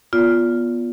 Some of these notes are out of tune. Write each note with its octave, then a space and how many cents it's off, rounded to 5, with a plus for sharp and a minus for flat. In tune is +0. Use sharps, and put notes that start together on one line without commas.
B3 -20 F4 +0 D5 -35